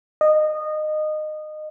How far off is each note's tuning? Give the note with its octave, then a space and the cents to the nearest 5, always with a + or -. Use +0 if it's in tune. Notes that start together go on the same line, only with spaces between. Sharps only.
D#5 -20